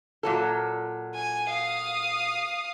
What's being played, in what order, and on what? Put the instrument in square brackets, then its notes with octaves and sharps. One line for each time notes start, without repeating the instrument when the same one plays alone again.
[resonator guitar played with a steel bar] A#2 F#3 A4
[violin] G#5
F5 D#6